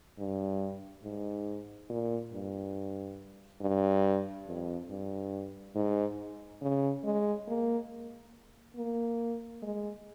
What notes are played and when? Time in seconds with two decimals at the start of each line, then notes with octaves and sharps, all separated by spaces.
0.19 G2
1.04 G#2
1.90 A#2
2.33 G2
3.61 G2
4.47 F2
4.90 G2
5.75 G#2
6.62 C#3
7.04 G#3
7.48 A#3
8.76 A#3
9.62 G#3